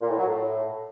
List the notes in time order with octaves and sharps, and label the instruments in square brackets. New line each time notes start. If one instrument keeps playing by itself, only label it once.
[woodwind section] A#2
A2
F#3
A2